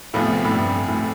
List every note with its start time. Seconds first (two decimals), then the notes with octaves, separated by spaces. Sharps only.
0.13 E2 A2 C3 F3 B3 F4
0.44 A2
0.51 G2
0.88 A2